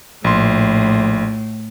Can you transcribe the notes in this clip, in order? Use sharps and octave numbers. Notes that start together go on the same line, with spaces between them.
A#1 A2 C6